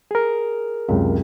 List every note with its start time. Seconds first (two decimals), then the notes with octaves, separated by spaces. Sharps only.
0.11 G#4 A#4
0.88 C#2 F#2 C3